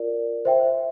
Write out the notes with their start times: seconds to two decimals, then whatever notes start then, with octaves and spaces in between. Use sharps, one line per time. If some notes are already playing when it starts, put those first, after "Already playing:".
Already playing: F4 A#4 D5
0.45 C5 E5 G5